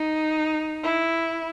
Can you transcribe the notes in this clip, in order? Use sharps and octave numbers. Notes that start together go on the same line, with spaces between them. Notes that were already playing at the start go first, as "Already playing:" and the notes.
Already playing: D#4
E4